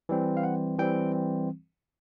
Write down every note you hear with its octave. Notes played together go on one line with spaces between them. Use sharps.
E3 G3 C4
F5
F#5
E3 G3 C4 G5